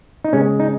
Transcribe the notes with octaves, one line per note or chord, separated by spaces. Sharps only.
D#4
C#3 G#3 C#4
D#4